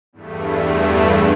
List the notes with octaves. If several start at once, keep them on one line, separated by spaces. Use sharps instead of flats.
E2 G2 A3